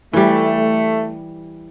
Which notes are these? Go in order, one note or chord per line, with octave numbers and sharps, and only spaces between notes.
E3 G3 A3